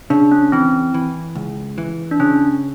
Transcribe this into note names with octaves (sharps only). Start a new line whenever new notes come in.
C#3 D4
C#4
E3 C4
E3
C#2
E3
D4
C#3 C#4